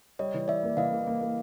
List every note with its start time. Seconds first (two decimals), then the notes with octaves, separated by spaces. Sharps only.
0.19 G3 C#5 D#5
0.34 E3
0.48 E3 D5 E5
0.63 A#3
0.77 E3 D#5 F5
0.91 A#3
1.07 A#3
1.21 A#3